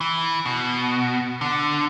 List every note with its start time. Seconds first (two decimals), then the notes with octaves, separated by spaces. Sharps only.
0.01 E3
0.45 B2
1.41 D3